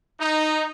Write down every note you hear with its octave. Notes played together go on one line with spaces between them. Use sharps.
D#4